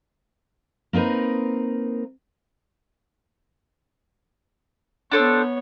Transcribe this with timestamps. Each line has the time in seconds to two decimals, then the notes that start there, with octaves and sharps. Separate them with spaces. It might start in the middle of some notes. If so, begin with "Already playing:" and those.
0.93 A#3 C4 D#4 A#4 B4
5.12 B3 D4 A4 C5 C#5